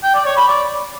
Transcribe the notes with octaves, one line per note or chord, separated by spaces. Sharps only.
G5
D5
C#5
B5
D5